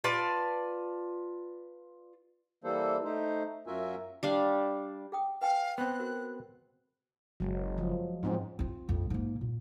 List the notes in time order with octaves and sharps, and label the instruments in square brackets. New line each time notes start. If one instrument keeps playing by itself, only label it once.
[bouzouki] F4 B4 D5 A5
[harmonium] E3 G3 A#3 A4 C5
A3 D#4 C5
F#2 F4 F#4 A#4 E5 G#5
[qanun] G3 D4 F5
[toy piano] G#4 G5 D#6
[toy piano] B4 G5 G#5 [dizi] F5
[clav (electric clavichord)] B3 C4 [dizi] F#6
[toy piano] F#4 A#4
[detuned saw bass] F#1 [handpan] F#3 G#3
[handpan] F3
[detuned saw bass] G#2 [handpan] F3 C4 C#4
[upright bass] C4 F4
A#1 F2
G#2 A#3
A#2